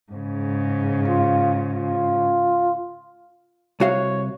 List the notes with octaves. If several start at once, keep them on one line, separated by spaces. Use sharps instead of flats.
G#2 C#3
F4
F4
C2 F#4 C#5 F5